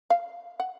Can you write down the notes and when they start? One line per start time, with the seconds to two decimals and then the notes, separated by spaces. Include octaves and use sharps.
0.10 F5
0.60 F#5